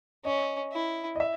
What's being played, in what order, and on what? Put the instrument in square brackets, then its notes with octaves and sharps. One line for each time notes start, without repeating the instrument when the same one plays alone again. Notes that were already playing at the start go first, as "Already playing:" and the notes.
[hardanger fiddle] C#4 [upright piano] D#5
[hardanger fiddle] E4
[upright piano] D#5
E5